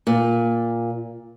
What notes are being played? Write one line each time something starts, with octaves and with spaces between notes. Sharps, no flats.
A#2